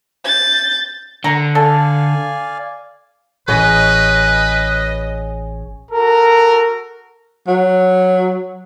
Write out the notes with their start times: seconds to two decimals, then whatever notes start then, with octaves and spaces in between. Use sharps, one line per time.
0.25 G6 A6
1.24 D3 A#5
1.55 A4 D5 F5 G#5
3.48 A1 G#4 B4 C#5 D#5 G#5
5.92 F#4 A4 A#4
7.48 F#3